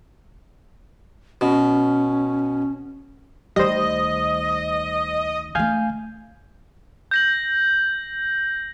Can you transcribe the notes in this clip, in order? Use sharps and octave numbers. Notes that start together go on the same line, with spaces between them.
B2 C#4
D2 D#3 G3 C5 D#5
D3 A3 F5 G#5 G6
G6 A#6 F#7